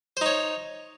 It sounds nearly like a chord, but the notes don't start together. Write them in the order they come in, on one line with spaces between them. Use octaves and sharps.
C5 D#4 C#5